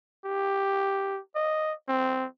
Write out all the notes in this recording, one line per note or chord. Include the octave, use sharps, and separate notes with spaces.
G4
D#5
C4